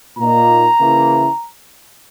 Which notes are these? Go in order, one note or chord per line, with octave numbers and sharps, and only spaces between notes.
A#2 A#3 D#4 A#5
C#3 E3 A#3 E4